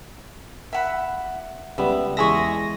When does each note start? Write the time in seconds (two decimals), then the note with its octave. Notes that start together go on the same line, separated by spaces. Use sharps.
0.73 E5 F#5 B5
1.78 C#2 G3 B3 E5
2.17 E2 G#3 E5 G#5 C#6 A#6